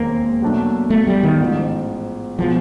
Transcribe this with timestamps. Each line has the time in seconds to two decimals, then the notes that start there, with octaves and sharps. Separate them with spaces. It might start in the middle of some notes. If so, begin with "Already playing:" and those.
Already playing: E1 D#2 D#3 G#3 A#3 C4
0.42 B2 F#3 A3 D4
0.90 A3
1.07 G3
1.23 D#3
1.40 A1 G#2 F3
2.39 B2 F3 G#3 B3